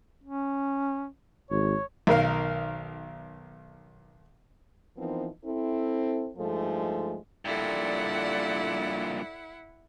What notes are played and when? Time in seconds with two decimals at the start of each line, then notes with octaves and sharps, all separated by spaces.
0.24 C#4
1.51 G#1 C#5
2.07 B1 D#3 A#4 F5
4.98 E3 F3 B3 C4 D#4 A#4
5.45 C4 E4 A4
6.38 G2 F3 G#3 A3 D#4 A4
7.45 G2 A#2 E4 A4 D5 F#5